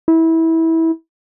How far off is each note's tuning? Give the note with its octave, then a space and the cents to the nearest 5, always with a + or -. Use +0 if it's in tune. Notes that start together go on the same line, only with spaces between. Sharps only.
E4 -20